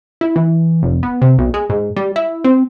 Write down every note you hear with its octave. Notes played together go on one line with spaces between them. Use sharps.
E4
E3
F1
B3
C3
B1
G#3
G#2
G3
E4
C4